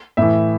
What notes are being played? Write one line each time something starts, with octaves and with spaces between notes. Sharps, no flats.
A2 E3 E5